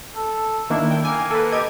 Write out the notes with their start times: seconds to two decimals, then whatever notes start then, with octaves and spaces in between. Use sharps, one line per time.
0.16 A4
0.70 D#3 A#3 D4 E4
0.91 G5
1.05 A#3 G#5
1.31 A4 B4
1.52 G4 D#5 G#6